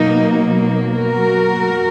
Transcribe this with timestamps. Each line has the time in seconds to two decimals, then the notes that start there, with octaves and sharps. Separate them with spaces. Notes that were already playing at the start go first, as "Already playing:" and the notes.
Already playing: B2 F#3 A#3 D#4
0.95 F#4 A#4